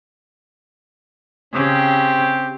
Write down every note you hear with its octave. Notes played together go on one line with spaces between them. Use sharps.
C#3 C4 G4